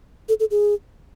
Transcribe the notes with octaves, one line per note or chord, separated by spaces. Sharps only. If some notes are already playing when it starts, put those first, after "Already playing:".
A4
A4
G#4